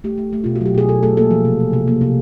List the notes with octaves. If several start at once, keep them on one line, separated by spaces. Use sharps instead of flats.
A3 G4
A3
A3
B2 F4
F#4
F#3 G4
B2 G#4
B2 A4
A3 A4
A#3 A4
F3
C3
F3
C3
A#3
C3